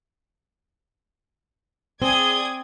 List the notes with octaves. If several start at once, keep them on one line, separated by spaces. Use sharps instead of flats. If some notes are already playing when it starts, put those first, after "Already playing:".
C4 G#4 D5 D#6 G#6 G7